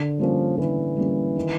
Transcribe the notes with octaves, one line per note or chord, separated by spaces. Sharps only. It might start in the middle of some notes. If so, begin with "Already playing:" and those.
Already playing: D3
F3 G3 A#3 C#4
D3 E3
G3 A#3 C#4
D#3